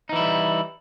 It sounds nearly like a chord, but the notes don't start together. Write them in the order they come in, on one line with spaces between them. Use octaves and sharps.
D#4 E3 E4 G3